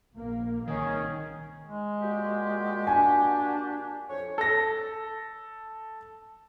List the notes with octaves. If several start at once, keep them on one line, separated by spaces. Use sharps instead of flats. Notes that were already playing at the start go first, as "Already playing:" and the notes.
A#1 A#2 A#3
C2 D#3 C#4 G#4
G#3
A#2 F#4 G4
D4 G#5
F2 C#5
A4 A#6